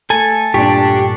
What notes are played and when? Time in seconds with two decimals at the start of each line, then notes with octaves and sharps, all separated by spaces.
0.10 A3 A4 G#5
0.54 G2 A#2 D4 G4 C#6